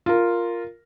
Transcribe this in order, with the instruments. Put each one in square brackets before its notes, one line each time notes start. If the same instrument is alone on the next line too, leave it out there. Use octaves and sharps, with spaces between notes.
[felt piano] F4 A#4